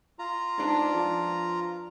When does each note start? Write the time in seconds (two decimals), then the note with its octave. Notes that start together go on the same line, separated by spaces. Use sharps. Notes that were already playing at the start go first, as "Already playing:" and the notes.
0.19 F4 A#5
0.58 G#2 B3 D4
0.94 F3